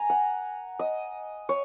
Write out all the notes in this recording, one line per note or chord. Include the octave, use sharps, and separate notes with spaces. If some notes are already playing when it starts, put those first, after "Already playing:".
Already playing: G#5 A#5
F#5
D#5
C#5